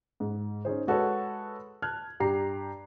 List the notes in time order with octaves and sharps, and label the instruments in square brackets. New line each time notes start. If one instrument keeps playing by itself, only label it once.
[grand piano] G#2
C#4 D#4 G#4 C5
G#3 F#4 A4 B4 C#5
A5 F6 F#6 G#6
G2 G4 A#5 C7